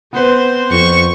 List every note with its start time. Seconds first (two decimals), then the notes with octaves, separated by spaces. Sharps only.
0.13 B3 C4 B4 C5
0.71 F2 C#6